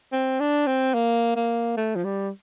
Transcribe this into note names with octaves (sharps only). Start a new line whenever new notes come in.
C4
D4
C4
A#3
A#3
A3
F3
G3